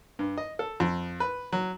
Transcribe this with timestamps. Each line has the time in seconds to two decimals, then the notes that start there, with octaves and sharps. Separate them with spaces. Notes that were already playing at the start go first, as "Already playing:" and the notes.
0.19 G2
0.38 D#5
0.59 A4
0.80 F2
1.20 B4
1.53 F#3